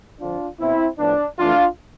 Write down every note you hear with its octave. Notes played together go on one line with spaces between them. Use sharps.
F2 D3 F3 C4 D4 F4
B2 B3 C4 E4
A2 F3 B3 D4
F2 E3 A3 D4 F4